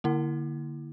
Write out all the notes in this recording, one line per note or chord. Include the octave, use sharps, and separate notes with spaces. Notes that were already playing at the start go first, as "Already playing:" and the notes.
D3 A#3 E4